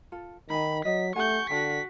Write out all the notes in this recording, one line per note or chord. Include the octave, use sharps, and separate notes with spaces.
F4 A4
D#3 D#4 G#5 B5
F#3 D#5 B6
A3 G4 F#5 G#5 C#6 G6
D3 F#4 G5 A5 B6